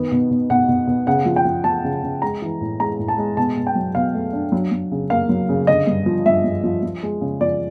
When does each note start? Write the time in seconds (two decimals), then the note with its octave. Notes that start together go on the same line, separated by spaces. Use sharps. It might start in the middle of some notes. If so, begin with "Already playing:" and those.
Already playing: D#3 B3
0.12 B2
0.31 B2
0.50 B2 F#5
0.68 B2
0.87 B2
1.07 C#3 F#5
1.26 F3
1.36 G5
1.45 F3
1.64 F3 A5
1.84 C#3
2.03 C#3
2.22 G#3 A#5
2.42 E3
2.61 A2
2.80 G#3 A#5
2.99 A2
3.08 A5
3.18 G#3
3.37 B2 A5
3.57 B2
3.67 G5
3.75 F#3
3.95 B2 F5
4.14 A3
4.33 D4
4.52 F#3
4.72 F#3
4.92 C#3
5.10 A#3 F5
5.29 F#3
5.49 C#3
5.67 D3 D#5
5.87 G2
6.06 F3
6.26 G2 E5
6.44 G2
6.64 F3
6.83 F3
7.03 G#3
7.21 C#3
7.41 F3 D5